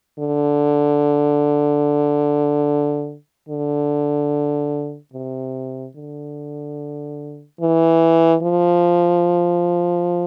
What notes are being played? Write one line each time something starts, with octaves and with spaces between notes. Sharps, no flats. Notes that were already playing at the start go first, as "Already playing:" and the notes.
D3
D3
C3
D3
E3
F3